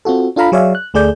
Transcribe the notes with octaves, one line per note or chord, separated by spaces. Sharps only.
C4 F4 F#4 A4
D4 F4 A4 F5 A#5 B5
F#3 G#4 C#5 D5 E5 F5
F#6
D2 A3 G#4 D5 G6